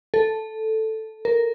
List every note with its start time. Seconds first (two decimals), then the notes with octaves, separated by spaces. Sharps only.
0.14 A4
1.25 A#4